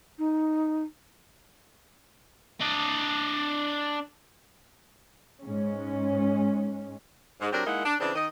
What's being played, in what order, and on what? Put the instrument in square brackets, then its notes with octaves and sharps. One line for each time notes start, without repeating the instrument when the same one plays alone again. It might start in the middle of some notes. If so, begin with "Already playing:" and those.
[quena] D#4
[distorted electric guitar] D4 D#5
[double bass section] G#2 G#3 C#4
[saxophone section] G#2
F#3 C4 D4 G4 A#4
G#3 A#3 D#4 E4 F#5
D4
C#3 E3 C4 D4
D#3 D#5